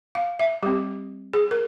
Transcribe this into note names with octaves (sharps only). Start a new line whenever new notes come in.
F5
E5
G3 C4 G4
G#4
A#4